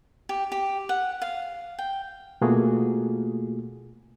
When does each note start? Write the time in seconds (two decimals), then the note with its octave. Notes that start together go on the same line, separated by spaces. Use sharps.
0.29 G4
0.52 G4
0.89 F#5
1.22 F5
1.79 G5
2.41 B2 A3 A#3 F4 F#4 G#4